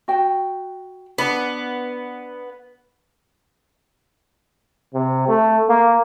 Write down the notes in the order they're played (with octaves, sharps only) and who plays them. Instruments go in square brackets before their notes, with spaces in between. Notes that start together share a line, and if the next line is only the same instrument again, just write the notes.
[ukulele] F#4 G5
[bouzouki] B3 [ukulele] D4
[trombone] C3
A3
A#3